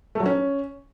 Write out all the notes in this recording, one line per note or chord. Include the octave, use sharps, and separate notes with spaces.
A3
F#3
C#4